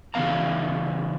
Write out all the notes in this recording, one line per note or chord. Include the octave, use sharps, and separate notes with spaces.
C#3 E3 B3 F5 A#5